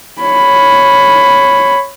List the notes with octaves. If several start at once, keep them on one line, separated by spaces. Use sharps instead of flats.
C#5 B5